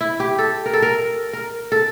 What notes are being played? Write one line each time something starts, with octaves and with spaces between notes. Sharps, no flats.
E4
G4
A4
A#4
A4
A#4
A#4
A4